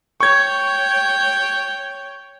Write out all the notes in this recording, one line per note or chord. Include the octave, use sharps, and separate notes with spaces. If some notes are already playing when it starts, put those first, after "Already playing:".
C#5 G5 C#6 G#6